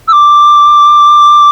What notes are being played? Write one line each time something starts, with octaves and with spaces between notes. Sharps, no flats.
E6
D6